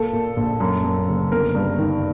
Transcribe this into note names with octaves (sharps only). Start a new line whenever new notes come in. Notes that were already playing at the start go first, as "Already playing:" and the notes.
Already playing: A#2 A4
A#2
A#1
F#2
F#2
F#1
G1 A#4
G2
D#3